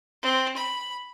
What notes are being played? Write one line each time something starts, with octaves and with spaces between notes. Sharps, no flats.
C4
B5